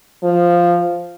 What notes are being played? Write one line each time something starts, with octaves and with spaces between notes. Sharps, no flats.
F3